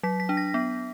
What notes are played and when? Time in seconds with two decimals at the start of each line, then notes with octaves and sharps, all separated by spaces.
0.03 F#3 B6
0.20 B6
0.29 D4
0.37 A#6
0.54 B3